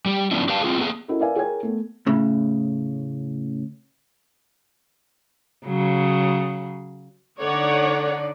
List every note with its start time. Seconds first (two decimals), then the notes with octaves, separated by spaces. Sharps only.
0.06 G3 G4
0.31 F3 B3 C#4 D4 E4
0.49 G4 B4 D5 F5 G5 A5
0.63 C4 C#4 F4 G#4
0.78 A#3 B3 G#4
1.08 C#4 E4 F#4 A4 A#4 D#5
1.20 A#4 B4 D5 E5 F5 G#5
1.36 G#4 A#4 C#5 G5 G#5 G#6
1.63 A3 B3
2.06 A2 C#3
5.66 C#3 F#3
7.40 D3 D#4 A4 C#5 D5 F#5